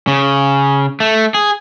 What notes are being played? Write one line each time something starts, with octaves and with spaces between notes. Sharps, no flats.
C#3
A3
G#4